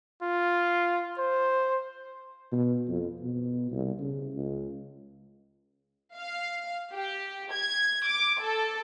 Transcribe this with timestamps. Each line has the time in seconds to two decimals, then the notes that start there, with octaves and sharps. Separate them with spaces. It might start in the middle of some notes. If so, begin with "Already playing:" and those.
0.22 F4
1.19 C5
2.52 B2
2.89 F2
3.20 B2
3.71 C2
4.00 C#3
4.34 C#2
6.16 F5
6.95 G4
7.52 G#6
8.08 D6
8.41 A4